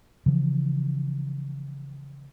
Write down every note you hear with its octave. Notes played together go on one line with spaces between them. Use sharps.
C#3 E3 F3